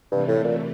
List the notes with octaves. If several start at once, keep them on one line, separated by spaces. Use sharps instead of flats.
G2 C3 E3 A3
A2
A#2